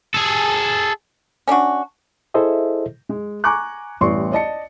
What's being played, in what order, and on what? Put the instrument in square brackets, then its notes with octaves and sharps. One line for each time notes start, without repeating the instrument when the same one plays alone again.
[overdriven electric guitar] G#4 A4
[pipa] C#4 D4 F4 F#4
[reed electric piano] E4 G#4 A4 C5 D#5 E5
[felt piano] G#3
G#5 A#5 C#6 D6 F#6
A1 G3 B3 D5 C6 C#6
D5 D#5 A5 C#7